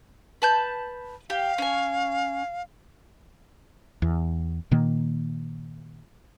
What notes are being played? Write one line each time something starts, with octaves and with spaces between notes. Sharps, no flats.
B4 A5 G6
G4 F5
C#4 G#5
E2
A#2 D#3 A#3